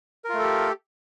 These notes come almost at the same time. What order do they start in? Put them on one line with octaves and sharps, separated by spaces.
A#4 F4 A3 A4 G4